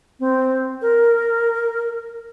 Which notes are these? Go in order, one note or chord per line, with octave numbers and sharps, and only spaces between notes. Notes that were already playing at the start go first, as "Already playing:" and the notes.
C4
A#4